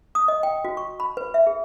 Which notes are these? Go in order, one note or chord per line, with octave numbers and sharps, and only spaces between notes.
D#6
D#5
G5
F#4
C#6
B5
B4
E5
G#4